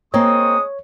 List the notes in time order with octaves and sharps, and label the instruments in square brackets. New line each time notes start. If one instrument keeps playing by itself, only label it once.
[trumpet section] G#3 C#6 D#6 [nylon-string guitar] A#3 C4 D#5 [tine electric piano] C#5